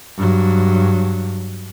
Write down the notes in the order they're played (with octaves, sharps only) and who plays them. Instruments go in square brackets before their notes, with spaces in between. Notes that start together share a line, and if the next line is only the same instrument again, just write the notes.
[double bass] G2 F#3